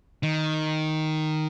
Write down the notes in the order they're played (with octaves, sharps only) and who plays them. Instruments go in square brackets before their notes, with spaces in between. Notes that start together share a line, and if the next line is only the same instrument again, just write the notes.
[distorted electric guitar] D#3